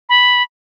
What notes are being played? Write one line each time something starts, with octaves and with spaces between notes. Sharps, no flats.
B5